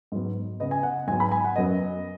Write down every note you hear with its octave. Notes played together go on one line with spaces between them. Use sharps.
G#2 F#3 B3
C#3 B3 D#5
G#5
F#5
G#2 F#3 B3 G#5
B5
G#5
F#5
F#2 F#3 B3 D#5